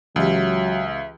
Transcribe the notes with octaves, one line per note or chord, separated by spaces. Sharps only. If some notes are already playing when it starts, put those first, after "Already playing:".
C#2 E3 F#3 G4 E5